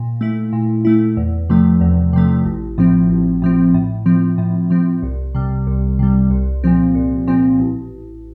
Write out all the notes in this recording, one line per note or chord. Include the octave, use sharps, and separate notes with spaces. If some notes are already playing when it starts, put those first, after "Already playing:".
Already playing: A#2
A3 E4
A#2
A3 E4
E2
C3 F3 A3
E2
C3 F3 A3
A1
A2 F3 C4
A1
A2 F3 C4
A2
F3 C4
A2
F3 C4
C2
C3 G3
C2
C3 G3
C2
A#2 F3 C4
C2
A#2 F3 C4
A1